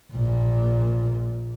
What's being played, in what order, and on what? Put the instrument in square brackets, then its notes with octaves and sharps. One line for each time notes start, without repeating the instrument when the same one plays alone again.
[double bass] A#1 A#2